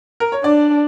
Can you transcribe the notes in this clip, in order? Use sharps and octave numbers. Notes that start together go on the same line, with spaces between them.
A#4
C#5
D4 D5